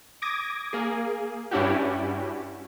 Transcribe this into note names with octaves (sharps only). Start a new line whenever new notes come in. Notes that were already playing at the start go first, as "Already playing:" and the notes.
D6 D#6 G#6 A#6
A#3 G#4
G2 C#4 D4 E4 F#4 G4